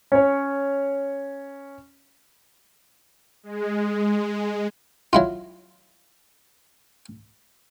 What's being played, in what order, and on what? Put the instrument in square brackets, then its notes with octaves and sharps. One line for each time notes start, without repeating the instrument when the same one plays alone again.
[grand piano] C#4 C#5
[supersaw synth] G#3
[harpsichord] F#3 E4 F4